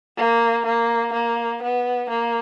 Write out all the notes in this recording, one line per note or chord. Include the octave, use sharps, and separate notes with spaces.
A#3
A#3
A#3
B3
A#3